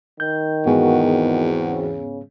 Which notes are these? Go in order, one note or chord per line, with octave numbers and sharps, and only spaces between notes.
D#3 G6
E2 G#2 E3 A#3 B3 F#4 G#4
C4 F#4
C#3